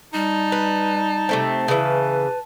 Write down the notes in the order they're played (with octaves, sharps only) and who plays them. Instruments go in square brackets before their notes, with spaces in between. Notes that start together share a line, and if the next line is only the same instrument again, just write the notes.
[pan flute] G3 [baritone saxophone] D#4 [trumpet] A5
[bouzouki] B4
C3 A3 C4
[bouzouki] C#3 E3 [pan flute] B4